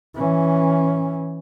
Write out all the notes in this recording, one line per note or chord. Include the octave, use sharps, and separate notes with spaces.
E3 C#4